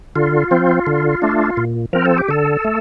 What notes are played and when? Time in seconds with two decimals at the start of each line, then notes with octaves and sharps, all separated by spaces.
0.16 D3 F4
0.51 F3 C4
0.86 D3
1.22 A3 D4
1.57 A#2
1.93 F3 C4 A#4
2.06 A4
2.18 G4
2.28 D3 A4
2.64 A3